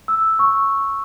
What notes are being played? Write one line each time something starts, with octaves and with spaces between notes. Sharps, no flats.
E6
C#6